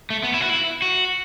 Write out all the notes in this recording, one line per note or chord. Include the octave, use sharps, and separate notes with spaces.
A3
B3
E4
F#4
E4
F#4